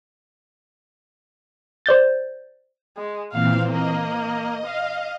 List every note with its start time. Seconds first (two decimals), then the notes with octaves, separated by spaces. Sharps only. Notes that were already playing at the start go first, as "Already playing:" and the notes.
1.86 C5 D5 G6 A6
2.97 G#3
3.32 A#2 E3 C4 F5
3.69 A#3 D#5
4.66 F5